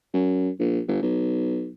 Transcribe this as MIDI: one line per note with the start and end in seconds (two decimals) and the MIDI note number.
0.14 0.50 42
0.60 0.81 34
0.88 0.98 31
1.03 1.70 35